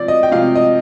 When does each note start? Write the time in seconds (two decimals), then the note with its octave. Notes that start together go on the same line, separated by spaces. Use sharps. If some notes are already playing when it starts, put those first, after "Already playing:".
Already playing: C3 F3 D5
0.08 D#5
0.23 G5
0.32 C3 F3 F5
0.56 D#5